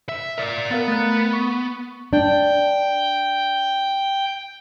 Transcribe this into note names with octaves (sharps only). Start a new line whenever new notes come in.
E5
A#4 D5
B3 A#4 F5 A6
A3 F#6
C#6
D4 G5